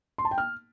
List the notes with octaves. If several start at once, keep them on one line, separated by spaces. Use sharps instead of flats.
C6
A5
G5
F6